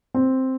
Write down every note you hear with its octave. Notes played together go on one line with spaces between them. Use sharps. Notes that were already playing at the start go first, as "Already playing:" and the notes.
C4